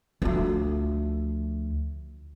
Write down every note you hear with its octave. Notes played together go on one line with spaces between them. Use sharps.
D2 F3